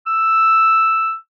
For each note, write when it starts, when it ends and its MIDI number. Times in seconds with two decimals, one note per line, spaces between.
0.07 1.15 88